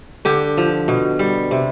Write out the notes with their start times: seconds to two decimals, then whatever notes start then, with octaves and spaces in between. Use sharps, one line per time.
0.25 D3 G4
0.57 F3
0.88 B2
1.19 G3
1.51 C3